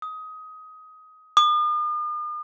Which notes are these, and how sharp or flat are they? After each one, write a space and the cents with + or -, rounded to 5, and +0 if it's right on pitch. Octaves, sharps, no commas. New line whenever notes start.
D#6 +20
D#6 -45